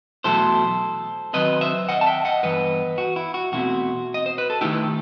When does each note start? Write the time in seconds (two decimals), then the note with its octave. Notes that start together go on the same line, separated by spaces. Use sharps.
0.24 E2 B2 F#3 A3 E4 A4 C5
1.34 D#3 F#3 C4 B4 D#5
1.61 C5 E5
1.89 D#5 F#5
2.01 A5
2.06 E5 G5
2.25 D#5 F#5
2.43 G2 E3 B3 B4 D#5
2.98 F#4
3.16 E4
3.34 F#4
3.52 E2 B2 A3 C4 E4 F#4
4.14 D#5
4.26 C5
4.38 B4
4.50 A4
4.61 D#3 A3 D#4 E4 G4